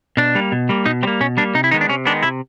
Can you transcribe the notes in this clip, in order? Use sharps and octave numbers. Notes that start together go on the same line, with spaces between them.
B2 D4
G3 A#3
B2
G3 A#3
B2 D#4
G3 A#3 C4
B2 C#4
G3 A#3 D4
C3 D#4
E4
D#3 G#3 B3 D#4
D4
C3 C#4
D#3 G#3 B3 D4
C3 E4